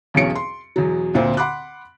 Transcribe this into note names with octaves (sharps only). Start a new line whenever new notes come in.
B1 E2 B2 C#4 C#7 D7
C6
E2 B2 F#3
D2 A#2 C4
F#5 B5 C6 D6 F#6